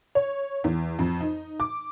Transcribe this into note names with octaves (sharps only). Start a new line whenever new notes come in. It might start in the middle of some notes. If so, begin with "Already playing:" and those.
C#5
E2
F2
D#4
D6